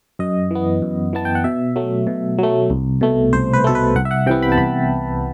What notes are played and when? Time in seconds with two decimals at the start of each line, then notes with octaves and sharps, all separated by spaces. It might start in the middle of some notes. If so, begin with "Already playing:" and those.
0.19 F#2 D#5
0.51 E3 B3
0.82 F#2
1.13 E3 B3 A5
1.25 G5
1.35 F#5
1.44 B2 E5
1.76 F#3 A3
2.07 B2
2.38 F#3 A3
2.70 C2
3.01 B2 A3
3.33 C2 C5
3.53 B4
3.64 B2 A3 A4
3.75 B4
3.95 C2 F#5
4.05 E5
4.11 F#5
4.26 C3 E3 B3 G5
4.42 B5
4.52 A5
4.58 C2 B5